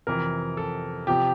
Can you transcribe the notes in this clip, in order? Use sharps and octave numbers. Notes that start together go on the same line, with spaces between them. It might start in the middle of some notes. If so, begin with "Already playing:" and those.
F2 C3 E3 A#4
A4
C3 F3 G4